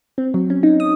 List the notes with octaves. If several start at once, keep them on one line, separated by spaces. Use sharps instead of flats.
C4
F#3
C#4
D#4
D#6